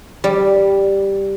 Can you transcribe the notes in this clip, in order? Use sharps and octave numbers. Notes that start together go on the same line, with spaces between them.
G3